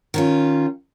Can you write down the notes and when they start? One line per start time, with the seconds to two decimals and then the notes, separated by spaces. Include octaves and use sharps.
0.14 D#3 C#4 F4